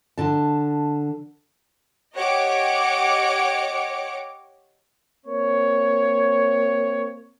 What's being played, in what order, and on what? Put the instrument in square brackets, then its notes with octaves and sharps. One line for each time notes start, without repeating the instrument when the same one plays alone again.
[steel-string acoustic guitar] D3 A5
[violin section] G4 C#5 D#5 F#5 D6 C#7
[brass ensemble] A#3 C4 C#5